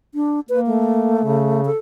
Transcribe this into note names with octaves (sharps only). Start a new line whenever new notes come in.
D4
A#3 B4
A3
C#3
A4